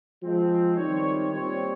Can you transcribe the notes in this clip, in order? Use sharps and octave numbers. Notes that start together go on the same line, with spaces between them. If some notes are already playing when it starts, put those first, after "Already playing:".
F3 G#3 C4
D#3 G3 C4 C#5
A#2 G3 C4 C#5